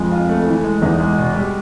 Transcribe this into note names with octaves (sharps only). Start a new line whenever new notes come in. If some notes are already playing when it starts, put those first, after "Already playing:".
Already playing: F2 F3 G#3
F4
A3
E3
G#3
E2 E3 D#4
G#3
B2
G3